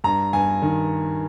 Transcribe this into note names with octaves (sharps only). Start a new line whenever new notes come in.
G2 A#5
G2 G#5
D#3